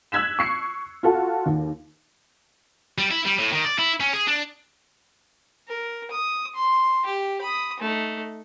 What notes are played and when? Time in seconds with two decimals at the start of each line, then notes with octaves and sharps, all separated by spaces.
0.12 E6 F#6 G#6 B6 E7
0.39 C#6 C7 C#7
1.03 F4 F#4 A4
1.46 D#2
2.98 G3
3.11 E4
3.26 G3
3.39 A2
3.53 D#3
3.65 D5
3.79 E4
4.00 C#4
4.13 G#4
4.27 D4
5.68 A#4
6.11 D#6
6.55 C6
7.05 G4
7.41 B5 D#6
7.80 A3 D#4